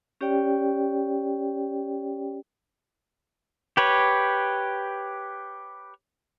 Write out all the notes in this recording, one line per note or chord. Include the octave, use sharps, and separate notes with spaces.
C#4 G4 C#5 D5 G5
G4 B4 C#5